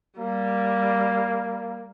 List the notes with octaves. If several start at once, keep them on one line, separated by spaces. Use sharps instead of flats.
G3 A#3